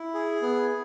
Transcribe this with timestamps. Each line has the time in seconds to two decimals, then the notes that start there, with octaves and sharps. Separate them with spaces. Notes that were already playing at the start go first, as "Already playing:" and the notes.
Already playing: E4
0.14 G#4
0.42 B3